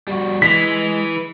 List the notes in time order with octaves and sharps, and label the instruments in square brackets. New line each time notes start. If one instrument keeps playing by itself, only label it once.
[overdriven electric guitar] G3 F#4
[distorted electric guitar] E3 [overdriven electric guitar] G#3 [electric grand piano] B6